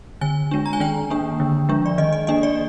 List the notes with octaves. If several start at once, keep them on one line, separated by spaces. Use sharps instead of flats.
D3 G#5
G#3 D4
A#5
G#5
D#3 G5
A#3 D4
D3
F3 G#3 D4
D5
D#3 D#5
D#5
A#3 D4 D#5
D5